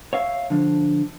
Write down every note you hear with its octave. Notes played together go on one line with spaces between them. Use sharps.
C#5 E5 F5
D3 F3